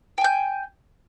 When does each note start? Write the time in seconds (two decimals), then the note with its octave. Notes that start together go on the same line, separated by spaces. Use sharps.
0.18 G5
0.21 G#5
0.24 G6